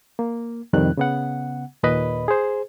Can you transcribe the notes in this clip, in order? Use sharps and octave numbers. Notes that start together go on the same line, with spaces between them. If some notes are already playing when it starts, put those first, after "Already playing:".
A#3
C2 F2 D#3 G3 F#6
C#3 B3 F#5
D#2 A#2 B4 D#5 B5
G#4 C5